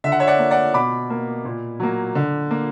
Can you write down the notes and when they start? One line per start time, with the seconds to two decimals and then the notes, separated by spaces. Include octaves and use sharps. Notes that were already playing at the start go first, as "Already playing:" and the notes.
0.04 D3 E5
0.12 F#5
0.20 C#5 E5
0.28 D5 F#5
0.39 A#3
0.51 D5 F#5
0.74 B2 B5 D6
1.10 A#3
1.45 A#2
1.80 F#3 A#3
2.15 D3
2.51 A#3